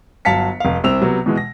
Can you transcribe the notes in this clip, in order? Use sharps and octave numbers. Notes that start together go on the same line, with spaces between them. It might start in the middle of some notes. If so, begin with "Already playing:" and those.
G1 F#3 F5 A5 B6 C#7
F1 F5
C2 C4 E6 F7
C3 F#3 B3
B2 E3 G#3
A#6